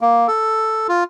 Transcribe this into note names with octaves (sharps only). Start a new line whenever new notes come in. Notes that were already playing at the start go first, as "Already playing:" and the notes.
A#3
A4
F4